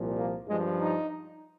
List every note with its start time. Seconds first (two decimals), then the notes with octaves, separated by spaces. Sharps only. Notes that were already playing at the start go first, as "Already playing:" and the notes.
Already playing: C2 A#2 F3
0.17 A#3
0.48 G2 F3 G#3
0.78 D#4